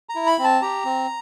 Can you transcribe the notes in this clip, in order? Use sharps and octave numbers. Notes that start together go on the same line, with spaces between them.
A#5
E4
B5
C4
A5
G4 A#5
C4